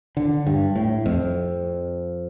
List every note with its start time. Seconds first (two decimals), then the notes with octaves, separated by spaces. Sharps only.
0.17 D3
0.47 G2
0.76 A2
1.06 F2